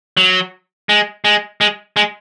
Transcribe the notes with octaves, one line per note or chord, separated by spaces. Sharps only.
F#3
G#3
G#3
G#3
G#3